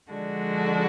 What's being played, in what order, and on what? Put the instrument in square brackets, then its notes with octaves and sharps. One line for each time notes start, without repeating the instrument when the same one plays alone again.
[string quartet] D3 F3 G#3 D4 F#4